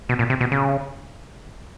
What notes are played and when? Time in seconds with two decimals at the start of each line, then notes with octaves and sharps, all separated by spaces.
0.09 B2
0.19 A#2
0.30 C3
0.41 B2
0.52 C#3